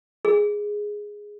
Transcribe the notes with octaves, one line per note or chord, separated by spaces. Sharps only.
G#4